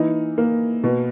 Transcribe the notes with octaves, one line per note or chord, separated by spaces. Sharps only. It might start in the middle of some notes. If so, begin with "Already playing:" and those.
Already playing: E3 A#3 D#4
A#3
B2